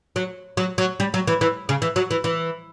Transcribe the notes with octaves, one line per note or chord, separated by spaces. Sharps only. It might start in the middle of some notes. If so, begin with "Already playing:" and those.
F#3
F#3
F#3
G3
F#3
E3
E3
C#3
E3
F#3
E3
E3